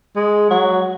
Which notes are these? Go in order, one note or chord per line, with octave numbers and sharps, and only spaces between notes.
G#3
F#3